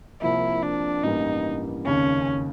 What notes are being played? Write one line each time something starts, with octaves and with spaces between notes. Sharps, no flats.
C2 C3 F3 A#3 E4
D4
A1 G2 E3 G3 A#3 D#4
F1 D#2 C#3 C#4